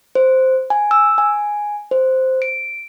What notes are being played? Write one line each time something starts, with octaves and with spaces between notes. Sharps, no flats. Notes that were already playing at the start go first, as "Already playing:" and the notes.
C5
G#5
E6
G#5
C5
D7